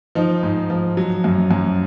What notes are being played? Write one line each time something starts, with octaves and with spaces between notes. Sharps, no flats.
F3 D#4
G#2
F3
F#3
F#2
F#2